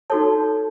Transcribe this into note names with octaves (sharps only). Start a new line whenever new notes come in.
D#4 F#4 A4 C#5 A5